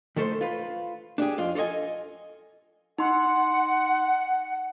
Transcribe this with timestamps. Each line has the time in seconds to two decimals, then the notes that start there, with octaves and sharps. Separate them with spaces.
0.16 D#3 A3 A4 A#4 C5
0.41 F4 B4
1.18 D4 G4 G#4
1.38 F2 F4
1.55 F4 A4 C5 D#5 G#5
2.98 D#4 F#5 C6